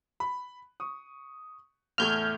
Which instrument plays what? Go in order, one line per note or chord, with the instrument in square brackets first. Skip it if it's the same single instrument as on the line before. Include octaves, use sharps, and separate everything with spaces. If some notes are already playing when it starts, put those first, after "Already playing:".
[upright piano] B5
C#6 D#6
[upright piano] E2 A2 A3 [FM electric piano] F6 G6 G#6